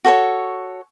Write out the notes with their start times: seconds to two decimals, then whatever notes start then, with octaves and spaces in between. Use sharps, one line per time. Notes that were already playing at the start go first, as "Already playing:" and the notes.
0.05 F#4 A4 C5 C#5